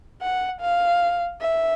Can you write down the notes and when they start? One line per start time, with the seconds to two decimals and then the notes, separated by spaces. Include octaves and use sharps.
0.22 F#5
0.61 F5
1.41 E5